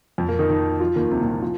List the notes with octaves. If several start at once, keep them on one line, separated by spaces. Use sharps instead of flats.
F2 F3
A#2 A#3
D#3 D#4
D#3 D#4
F3 F4
D#2 D#3
C2 C3
A#2
D#2 D#3
F3 F4